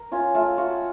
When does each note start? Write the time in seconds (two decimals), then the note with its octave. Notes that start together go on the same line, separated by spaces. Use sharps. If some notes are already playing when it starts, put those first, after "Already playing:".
Already playing: A#4
0.12 C#4 F4
0.34 A3 F4
0.58 F4 F#4